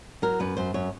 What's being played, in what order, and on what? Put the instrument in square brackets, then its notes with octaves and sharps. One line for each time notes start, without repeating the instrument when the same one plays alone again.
[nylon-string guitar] F#3 A#4
F#2 B4
F#2 C5
F#2 C#5